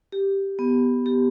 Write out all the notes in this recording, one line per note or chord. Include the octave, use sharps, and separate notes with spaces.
G4
B3
G4